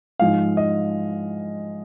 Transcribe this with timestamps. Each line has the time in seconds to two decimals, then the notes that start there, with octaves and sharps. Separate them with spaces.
0.19 G#2 F3 G#3 F5
0.57 D#5